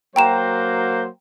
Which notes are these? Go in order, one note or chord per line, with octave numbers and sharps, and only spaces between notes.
F#3 A#3 C5 G5 A#5 E7